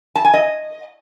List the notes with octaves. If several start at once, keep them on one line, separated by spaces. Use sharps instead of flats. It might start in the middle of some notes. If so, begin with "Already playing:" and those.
A5
G#5
D#5